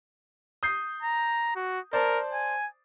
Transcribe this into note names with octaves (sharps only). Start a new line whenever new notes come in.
D#6 G6 C7
A#5
F#4
A#4 C5 D5 A5
G#5